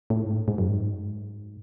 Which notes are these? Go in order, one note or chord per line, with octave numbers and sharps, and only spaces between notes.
A2
G#2
A2
G#2
F#2
G#2